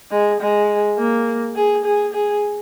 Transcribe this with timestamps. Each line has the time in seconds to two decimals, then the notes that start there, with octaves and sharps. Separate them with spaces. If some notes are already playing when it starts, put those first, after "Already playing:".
0.11 G#3
0.40 G#3
0.98 A#3
1.55 G#4
1.85 G#4
2.14 G#4